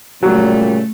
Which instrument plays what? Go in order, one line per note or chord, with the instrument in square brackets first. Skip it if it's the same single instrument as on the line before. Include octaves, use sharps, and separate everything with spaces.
[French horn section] A#2 C#3 G3 [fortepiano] F#3 [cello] A3